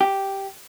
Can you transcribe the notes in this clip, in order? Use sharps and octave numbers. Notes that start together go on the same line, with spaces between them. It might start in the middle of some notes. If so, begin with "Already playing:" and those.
G4